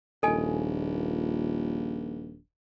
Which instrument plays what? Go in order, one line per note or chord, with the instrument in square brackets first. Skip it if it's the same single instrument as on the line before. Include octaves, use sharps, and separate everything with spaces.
[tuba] D#1 [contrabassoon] A#1 [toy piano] A4 D#5 G#5